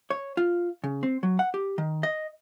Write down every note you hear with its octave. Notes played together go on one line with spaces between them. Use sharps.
C#5
F4
C#3
C4
F#3
F#5
G4
D#3
D#5